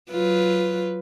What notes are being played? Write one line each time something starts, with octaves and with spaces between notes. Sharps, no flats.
F#3 F4 B4